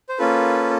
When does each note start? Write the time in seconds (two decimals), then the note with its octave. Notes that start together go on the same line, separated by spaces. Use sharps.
0.09 C5
0.18 A#3 C#4 F4 A4 B4